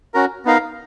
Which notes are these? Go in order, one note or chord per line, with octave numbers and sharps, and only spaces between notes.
C#4 F#4 A#4
B3 D#4 A#4 F5